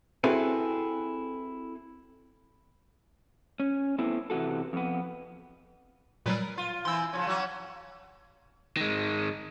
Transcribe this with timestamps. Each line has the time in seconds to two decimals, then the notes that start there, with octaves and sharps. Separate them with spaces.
0.24 C4 E4 F#4 G#4 A4 B4
3.60 C#4
3.98 A3 B3 C4 E4
4.30 C3 E3 F4 F#4 A4
4.73 F2 B3
6.26 A#2 F#3 G3 A#4 B4
6.57 F4
6.85 E3 C4 E4 C6 E6
7.13 C#3 F3 C#4
7.27 F#3 C#4 F#4
8.77 D#3 G#3